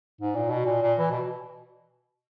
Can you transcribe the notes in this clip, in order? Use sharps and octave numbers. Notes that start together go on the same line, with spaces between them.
G#2
A#2
B2
A#2
A#2
E3
B2